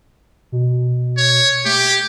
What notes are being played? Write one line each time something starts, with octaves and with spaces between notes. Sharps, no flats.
B2
C#5
A3 G4